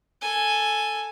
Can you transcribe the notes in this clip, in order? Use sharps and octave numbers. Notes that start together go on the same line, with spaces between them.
A4 G#5